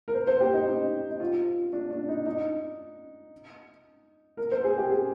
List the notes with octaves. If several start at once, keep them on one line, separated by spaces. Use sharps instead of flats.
A#4
C5
C5
G4
D#4
D#4
D#4
F4
D4
D4
D#4
D#4
A#4
C5
G#4
G4
G#4